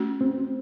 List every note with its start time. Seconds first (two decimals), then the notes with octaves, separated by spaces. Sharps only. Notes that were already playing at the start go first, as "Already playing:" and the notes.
Already playing: A3 C#4 F#4
0.21 C4